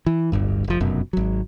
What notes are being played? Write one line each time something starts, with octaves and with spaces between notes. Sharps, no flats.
E3
D1 G1 G2
F1 F3
F1 F#2 B2
G#1 F#3